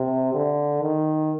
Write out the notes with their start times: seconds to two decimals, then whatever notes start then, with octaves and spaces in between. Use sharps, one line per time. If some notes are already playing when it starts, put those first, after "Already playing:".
Already playing: C3
0.34 D3
0.82 D#3